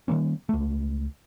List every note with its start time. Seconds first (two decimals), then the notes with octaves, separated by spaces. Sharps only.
0.08 D#3 G3 A#3 C#4
0.49 C#2 A3